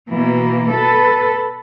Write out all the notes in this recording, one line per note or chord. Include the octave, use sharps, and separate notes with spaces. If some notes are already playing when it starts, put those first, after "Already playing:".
B2 E3 A#3
A4 B4